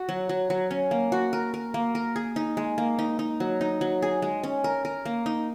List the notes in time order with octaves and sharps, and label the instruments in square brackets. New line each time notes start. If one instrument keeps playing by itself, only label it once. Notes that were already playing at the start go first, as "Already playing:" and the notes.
Already playing: [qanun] F#4
F#3
F#3
F#3
C#4
A#3
F#4
A#4
A#4
A#3
A#4
G#4
D#4
G#3
A#3
D#4
D#4
F#3
D#4
F#3
G#4
G#3
C#4
A#4
A#4
A#3
D#4